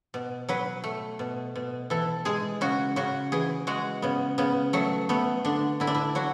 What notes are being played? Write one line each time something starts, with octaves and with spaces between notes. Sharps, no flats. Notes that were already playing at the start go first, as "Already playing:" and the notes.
B2
F#3 B4
A3
B2
B2
E3 A4
G#3 G#4
C#3 F#4
C#3 F#4
E3 G#4
G#3 F#4
C#3 B3
C#3 B3
F#3 A3
A3 B3
D3 D4
D3 E4
D4
E4
F#3 F#4